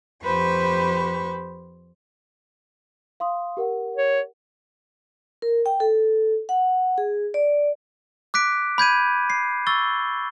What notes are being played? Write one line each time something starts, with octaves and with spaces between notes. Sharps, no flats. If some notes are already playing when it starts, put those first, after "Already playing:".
F2 G4 B4 C5 B5 C#6
F5 C6 D#6
G4 A#4 F#5
C#5
A#4
G5
A4
F#5
G#4
D5
D6 F#6 B6 D7
B5 G6 G#6 D#7
C7
C#6 E6 A6 G7